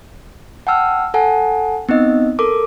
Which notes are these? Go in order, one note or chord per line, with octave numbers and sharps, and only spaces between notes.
F#5 G5 A5 E6 F6
A4 F#5 G#5 A5
B3 C4 D#4 D#5
A4 A#4 D6